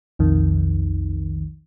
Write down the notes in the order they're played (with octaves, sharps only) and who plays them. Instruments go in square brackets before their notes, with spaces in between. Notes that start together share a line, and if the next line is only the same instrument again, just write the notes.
[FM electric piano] B1 F2 D#3